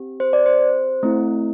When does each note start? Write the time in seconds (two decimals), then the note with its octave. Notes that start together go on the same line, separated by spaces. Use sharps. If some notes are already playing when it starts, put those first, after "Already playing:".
Already playing: C4 G4
0.20 C5
0.33 D5
0.46 C5
1.03 A3 C4 E4